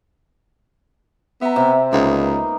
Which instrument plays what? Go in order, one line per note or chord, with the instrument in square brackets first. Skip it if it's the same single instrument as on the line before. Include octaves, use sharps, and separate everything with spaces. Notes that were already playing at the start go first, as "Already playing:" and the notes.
[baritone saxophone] B3 [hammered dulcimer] E5 A#5
[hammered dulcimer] C3 C4
[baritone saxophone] C#2 [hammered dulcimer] A#3 B3 D#4